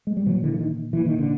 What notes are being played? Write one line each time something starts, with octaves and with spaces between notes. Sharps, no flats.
G#3
G3
A#2 E3 F#3
D3 E3
E3
D#3
A#2 E3
D#3
D3